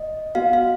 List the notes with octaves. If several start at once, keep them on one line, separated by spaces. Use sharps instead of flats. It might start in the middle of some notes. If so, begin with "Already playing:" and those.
Already playing: D#5
B3 F#4 F5
F5